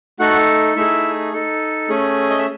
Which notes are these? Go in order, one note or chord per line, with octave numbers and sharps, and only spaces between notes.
A3 D#4 F#4 A4 F#5
A3 D#4 E4 G#4 E5
D#4 A4
A3 C#4 G#4
D#5
E5